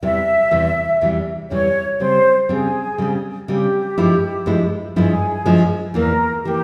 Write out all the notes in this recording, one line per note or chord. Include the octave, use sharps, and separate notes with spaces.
E2 C3 E3 G3 E5
E2 C3 E3 G3
E2 C3 E3 G3
E2 C3 E3 G3 C#5
C#3 G3 C4 C5
C#3 G3 C4 G#4
C#3 G3 C4
C#3 G3 C4 G4
G2 F3 G#3 E4
G2 F3 G#3 E4
G2 F3 G#3 E4 G#4
G2 F3 G#3 E4
E2 E3 A#3 A#4
E3 A#3 G4